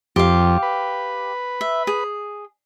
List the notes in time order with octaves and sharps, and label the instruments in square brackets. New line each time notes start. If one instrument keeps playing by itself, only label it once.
[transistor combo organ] F2 [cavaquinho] G4 F5
[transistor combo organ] B4
[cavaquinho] E5
G#4